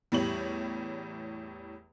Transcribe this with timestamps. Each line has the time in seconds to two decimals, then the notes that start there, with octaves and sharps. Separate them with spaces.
0.12 E2 A2 G3 G4 C#5 F#7